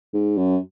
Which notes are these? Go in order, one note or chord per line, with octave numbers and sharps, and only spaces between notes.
G#2
F#2